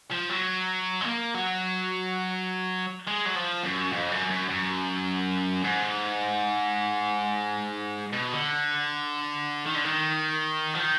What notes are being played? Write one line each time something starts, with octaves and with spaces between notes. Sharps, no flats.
F3
F#3
G#3
A#3
F#3
G#3
F#3
F3
F#2
F2
F#2
F#2
F#2
G#2
B2
D3
D#3
D3
D#3
F3
D#3